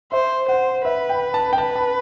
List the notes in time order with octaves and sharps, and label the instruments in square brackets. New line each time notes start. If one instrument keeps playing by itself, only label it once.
[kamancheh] C5 [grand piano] E5
[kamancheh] C5 [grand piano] F#5
[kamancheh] B4 [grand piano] E5
[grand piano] G5
A5
G5
[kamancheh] B4 [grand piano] A5
[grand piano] A5